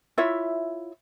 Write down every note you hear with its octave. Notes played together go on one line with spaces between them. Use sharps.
E4 F4 C#5 E5